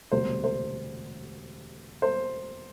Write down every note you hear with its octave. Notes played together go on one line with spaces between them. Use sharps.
E1 D2 C3 G3 C5
C5
C5